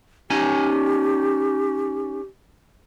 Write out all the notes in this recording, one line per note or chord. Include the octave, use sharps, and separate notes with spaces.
C#4 D#4 G4 G#5